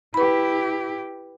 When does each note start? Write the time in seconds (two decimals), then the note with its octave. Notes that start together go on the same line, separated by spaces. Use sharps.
0.14 E4 G4 B4 B5